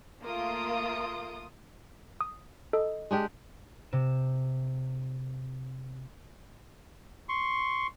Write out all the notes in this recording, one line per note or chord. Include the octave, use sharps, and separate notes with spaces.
A3 A#3 F4 C6 D#6 D7
D#6
A4 D#5
G#3 D4 G4
C3 E7
C6 C#6